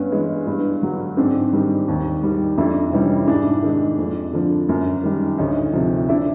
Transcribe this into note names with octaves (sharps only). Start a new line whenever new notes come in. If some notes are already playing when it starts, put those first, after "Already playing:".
Already playing: G2 B3 C#4
E3 G#3
G2
D3 F#3
G#2 C4 D4
D#3 G3
D#2
D#3 G3
F2 D4 E4
C3 E3 G3 C#4 D#4
G#2 D4 E4
D#3 G#3
F2
D3 F3
F#2
D#3 G3
D2 C#4 D#4
C3 F3
D4 E4